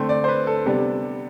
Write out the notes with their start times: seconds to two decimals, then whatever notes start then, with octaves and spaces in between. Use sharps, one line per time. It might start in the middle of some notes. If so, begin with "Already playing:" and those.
Already playing: D3 A3 C4
0.09 D5
0.24 C5
0.28 B4
0.47 A4
0.66 C3 G3 B3 D4